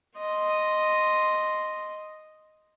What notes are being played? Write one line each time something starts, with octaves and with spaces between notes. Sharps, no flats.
D#5 C6